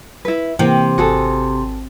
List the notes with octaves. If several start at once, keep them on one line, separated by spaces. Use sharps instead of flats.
E4 B4
C3 E3 A#3 C4 G5
G#1 F#4 G#4 A4